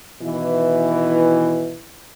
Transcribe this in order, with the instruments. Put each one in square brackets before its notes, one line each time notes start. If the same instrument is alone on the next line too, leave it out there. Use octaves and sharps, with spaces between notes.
[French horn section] B2 D#3 E3